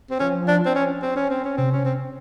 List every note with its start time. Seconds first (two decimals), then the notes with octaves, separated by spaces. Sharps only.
0.11 C4
0.20 F3 C#4
0.48 D4
0.66 C4
0.75 C#4
1.03 C4
1.16 C#4
1.30 C4
1.44 C#4
1.57 C3 C4
1.72 C#4
1.85 C4